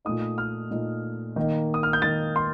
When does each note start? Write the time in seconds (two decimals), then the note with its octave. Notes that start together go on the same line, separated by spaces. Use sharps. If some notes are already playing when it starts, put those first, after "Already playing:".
0.05 A#2 A3 D#4 D#6
0.38 F6
0.71 A#2 A3 D#4
1.36 D#3 A#3 D#4
1.74 D#6
1.83 F6
1.93 G6
2.02 D#3 A#3 D#4 A6
2.36 C6